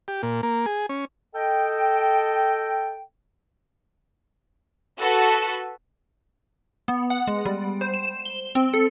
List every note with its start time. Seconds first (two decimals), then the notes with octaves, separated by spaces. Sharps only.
0.08 G4
0.23 A#2
0.43 A#3
0.66 G#4
0.89 C#4
1.35 A4 D#5 G5
4.99 F#4 A4 B4
6.88 B3
7.10 F#5
7.27 G#3
7.45 G3
7.81 C5
7.94 E7
8.25 G7
8.55 C4
8.74 A4